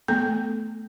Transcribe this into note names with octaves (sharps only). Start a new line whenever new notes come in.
A3 B3 A4 G5